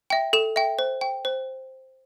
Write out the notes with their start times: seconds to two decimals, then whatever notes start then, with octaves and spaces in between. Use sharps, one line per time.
0.10 E5 G5
0.33 A4 E7
0.56 E5 G5
0.79 C5
1.01 G5
1.25 C5